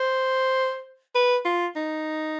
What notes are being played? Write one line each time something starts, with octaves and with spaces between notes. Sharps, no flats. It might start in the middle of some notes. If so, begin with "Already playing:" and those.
Already playing: C5
B4
F4
D#4